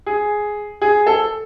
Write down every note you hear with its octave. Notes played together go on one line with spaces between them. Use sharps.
G#4
G#4
A4